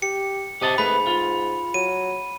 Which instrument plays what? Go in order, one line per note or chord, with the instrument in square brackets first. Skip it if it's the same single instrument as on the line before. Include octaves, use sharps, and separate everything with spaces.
[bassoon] G4 [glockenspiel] C#7
[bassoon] C3 [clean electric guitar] G4 D#5 A5
[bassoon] G#2 [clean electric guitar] A3 B4 [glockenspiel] B5
[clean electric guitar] F4
[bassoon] F#3 [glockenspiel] D#7